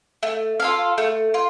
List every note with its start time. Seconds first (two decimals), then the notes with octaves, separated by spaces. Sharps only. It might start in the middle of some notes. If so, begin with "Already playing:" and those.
0.23 A3
0.60 F4 A4 F5
0.98 A3
1.34 F4